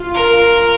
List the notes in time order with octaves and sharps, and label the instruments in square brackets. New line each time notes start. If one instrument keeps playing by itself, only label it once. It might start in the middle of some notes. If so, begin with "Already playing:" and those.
Already playing: [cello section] F4
[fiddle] A#4